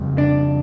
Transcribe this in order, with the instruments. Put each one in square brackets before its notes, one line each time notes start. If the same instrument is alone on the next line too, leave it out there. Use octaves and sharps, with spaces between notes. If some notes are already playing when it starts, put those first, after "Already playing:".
Already playing: [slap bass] F2 C#3 G3
[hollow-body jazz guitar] D4